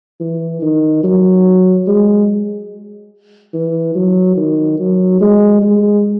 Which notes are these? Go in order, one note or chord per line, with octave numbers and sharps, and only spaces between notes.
E3
D#3
F#3
G#3
E3
F#3
D#3
F#3
G#3
G#3